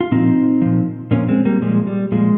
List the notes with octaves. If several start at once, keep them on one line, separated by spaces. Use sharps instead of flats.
F4
A#2 F3 C4 D#4
A#2 F3
A#2 F3 A#3 C#4
G#3 C4
G3 A#3
A#2 F3 G#3
G3
A#2 F3 G#3